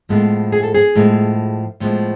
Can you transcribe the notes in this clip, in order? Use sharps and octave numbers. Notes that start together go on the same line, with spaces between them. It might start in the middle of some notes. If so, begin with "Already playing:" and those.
A2 F3 G#3 B3
G#4
A4
G#4
A2 F3 G#3 B3
A2 F3 G#3 B3